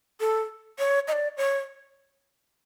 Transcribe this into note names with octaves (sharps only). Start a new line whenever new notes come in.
A4
C#5
D#5
D5
C#5